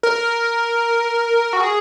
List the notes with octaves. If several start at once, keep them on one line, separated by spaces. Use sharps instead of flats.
A#4
F#4
G#4